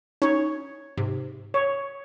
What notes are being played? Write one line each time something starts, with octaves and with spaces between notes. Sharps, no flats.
C#4 D#4 C#5
G#2 C3
C#5